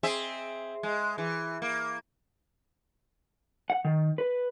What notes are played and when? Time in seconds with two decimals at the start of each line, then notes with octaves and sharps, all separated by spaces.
0.03 C4 G#4 E5
0.83 G#3
1.18 E3
1.62 A#3
3.70 F#5
3.85 D#3
4.18 B4